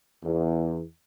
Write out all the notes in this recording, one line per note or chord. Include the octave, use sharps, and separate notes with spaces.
E2